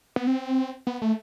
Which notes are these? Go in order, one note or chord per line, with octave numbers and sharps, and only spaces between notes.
B3
C4
B3
A3